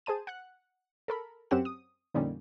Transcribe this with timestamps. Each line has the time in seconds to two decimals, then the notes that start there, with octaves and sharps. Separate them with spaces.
0.06 G#4 C5 A5 D#7
0.27 F#5 F#6
1.08 A4 A#4 B5
1.51 F#2 C4 C#4 G4 F#5 E7
1.65 D#6
2.14 F2 A#2 D3 G3 C#4 D#4